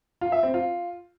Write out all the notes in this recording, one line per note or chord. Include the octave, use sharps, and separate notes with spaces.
F4
E5
C4
F4